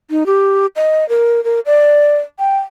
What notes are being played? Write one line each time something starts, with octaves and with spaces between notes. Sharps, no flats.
D#4
G4
D#5
A#4
A#4
D5
G5